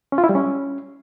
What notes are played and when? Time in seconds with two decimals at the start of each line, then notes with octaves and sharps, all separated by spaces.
0.12 C#4
0.18 F4
0.24 E4
0.29 G3
0.35 C#4